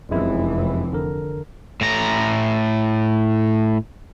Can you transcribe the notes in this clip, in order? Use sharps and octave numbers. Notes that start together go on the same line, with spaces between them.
F1 F#2 E3 G#3 E4
D3 A#4
A2 A#5